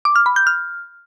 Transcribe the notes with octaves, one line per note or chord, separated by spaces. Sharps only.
D6
F6
B5
G6
F6